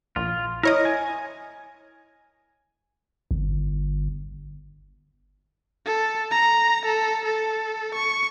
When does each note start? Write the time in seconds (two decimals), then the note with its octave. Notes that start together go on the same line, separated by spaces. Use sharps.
0.16 A#1 F4
0.63 E4 A#4 C#5 D#5
0.85 G#5
3.31 G1
5.86 A4
6.31 A#5
6.85 A4
7.25 A4
7.94 C#6